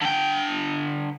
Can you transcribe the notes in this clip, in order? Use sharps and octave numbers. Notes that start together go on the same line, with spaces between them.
D3 G5